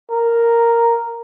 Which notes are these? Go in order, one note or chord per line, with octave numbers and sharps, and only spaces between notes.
A#4